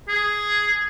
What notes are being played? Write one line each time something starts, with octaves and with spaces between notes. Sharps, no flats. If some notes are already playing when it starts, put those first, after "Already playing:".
G#4